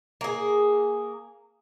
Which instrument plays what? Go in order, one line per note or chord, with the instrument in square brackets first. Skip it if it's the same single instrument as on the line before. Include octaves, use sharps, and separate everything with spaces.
[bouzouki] A#3 G#4